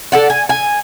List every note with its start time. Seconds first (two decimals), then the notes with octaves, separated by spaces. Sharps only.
0.12 A4 D5 F#5
0.30 G#5
0.49 G#5